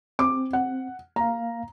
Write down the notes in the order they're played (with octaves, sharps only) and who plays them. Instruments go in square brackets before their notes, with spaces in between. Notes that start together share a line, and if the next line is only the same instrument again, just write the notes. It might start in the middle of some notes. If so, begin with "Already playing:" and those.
[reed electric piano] C4 [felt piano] D6
[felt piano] F#5
[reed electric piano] A#3 F5 [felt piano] A#5